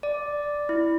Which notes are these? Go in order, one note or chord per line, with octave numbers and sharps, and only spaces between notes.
D5
E4